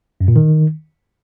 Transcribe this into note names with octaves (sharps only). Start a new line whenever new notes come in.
F#2
A#2
D#3